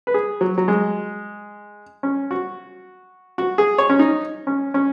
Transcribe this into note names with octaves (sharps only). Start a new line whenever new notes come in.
B4
G#4
F#3
F#3
G#3
C#4
F#4
F#4
G#4
C#5
C#4
D#4
C#4
C#4